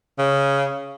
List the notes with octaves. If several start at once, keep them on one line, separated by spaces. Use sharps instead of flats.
C#3